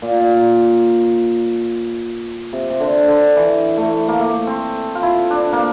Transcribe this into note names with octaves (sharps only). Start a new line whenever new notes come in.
A#2
C3
C3
D3
D3
E3
A3
A#3
A3
C4
F4
E4
D4
A#3